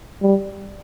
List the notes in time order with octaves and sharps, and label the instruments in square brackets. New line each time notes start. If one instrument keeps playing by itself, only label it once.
[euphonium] G3